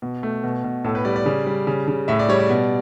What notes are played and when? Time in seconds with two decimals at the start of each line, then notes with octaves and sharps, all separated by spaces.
0.02 B2
0.23 A3
0.44 B2
0.64 B2
0.85 A2 A4
0.95 B4
1.05 G3 D5
1.16 D5
1.26 C#3
1.46 G3
1.67 C#3
1.88 C#3
2.08 A2 E5
2.19 D5
2.29 G3 C#5
2.40 D5
2.50 B2